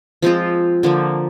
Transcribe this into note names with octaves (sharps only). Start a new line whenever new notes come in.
F3 G#3 C4 F4
D3 F3 A#3